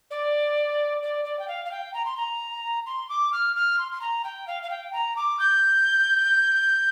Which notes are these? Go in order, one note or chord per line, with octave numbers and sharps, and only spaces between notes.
D5
D5
D5
G5
F5
F5
G5
A#5
C6
A#5
C6
D6
F6
F6
C6
C6
A#5
G5
F5
F5
G5
A#5
D6
G6